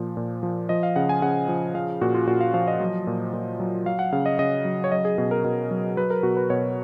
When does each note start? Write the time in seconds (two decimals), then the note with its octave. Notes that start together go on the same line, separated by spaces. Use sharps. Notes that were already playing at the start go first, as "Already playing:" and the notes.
Already playing: A#2 F3
0.17 A#2
0.43 F3
0.69 F3 D#5
0.83 F5
0.96 C#3 F#5
1.09 G#5
1.22 C#3 F#5
1.49 F3
1.75 F3 F5
2.01 A#2 F#4
2.14 F4
2.27 A#2 F#4
2.41 F5
2.54 F3 F5
2.68 D#5
2.80 F#3
3.07 A#2
3.33 A#2
3.60 F#3
3.86 F#3 F5
3.99 F#5
4.12 C#3 F5
4.26 D#5
4.39 C#3 D#5
4.65 F#3
4.84 C#5
4.91 F#3 D#5
5.05 G#4
5.18 B2 G#4
5.31 A#4
5.44 B2
5.71 F#3
5.97 F#3 B4
6.10 A#4
6.23 B2 F#4
6.37 B4
6.50 B2 C#5